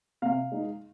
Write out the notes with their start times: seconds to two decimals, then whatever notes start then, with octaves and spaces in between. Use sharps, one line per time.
0.22 C3 F5
0.52 G#3 D#4